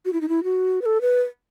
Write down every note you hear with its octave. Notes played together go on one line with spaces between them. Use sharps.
F#4
E4
D#4
E4
F#4
B4
A4
B4